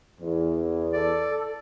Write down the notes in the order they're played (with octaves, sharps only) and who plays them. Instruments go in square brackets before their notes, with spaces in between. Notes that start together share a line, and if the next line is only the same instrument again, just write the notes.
[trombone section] E2
[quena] A4 [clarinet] D5